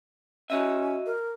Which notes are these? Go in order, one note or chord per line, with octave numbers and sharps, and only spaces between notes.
C#4 F#4 D#5 E5
A#4